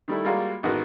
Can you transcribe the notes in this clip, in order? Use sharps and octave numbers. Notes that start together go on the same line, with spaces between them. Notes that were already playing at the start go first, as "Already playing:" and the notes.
D#3 G3 A3 E4
G3 G#3 A#3 F4 F#4
A1 D#3 G#3 B3 F#4 A#4